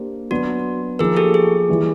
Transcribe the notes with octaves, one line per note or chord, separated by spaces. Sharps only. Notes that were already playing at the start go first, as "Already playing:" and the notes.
Already playing: A#3 D4 G4 C5
F#3 B3 D4 F#4
F3 A#3 D#4 G#4 A#4
G4 A4
G#4
E3 G3 A#3